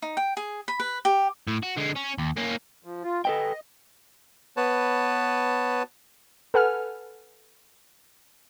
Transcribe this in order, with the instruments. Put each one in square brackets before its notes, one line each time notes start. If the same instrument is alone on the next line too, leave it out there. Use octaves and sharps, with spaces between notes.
[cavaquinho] D#4
G5
G#4
B5
B4
G4
[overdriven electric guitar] A2
F#4
D3 G#3
C#4
D#2
A#3 C#4
[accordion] F3
F4
[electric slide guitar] A4 B4 G5 [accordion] D#5
[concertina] B3 B4 C#5 A5
[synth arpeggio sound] A4 B4 F#5 G#5 F6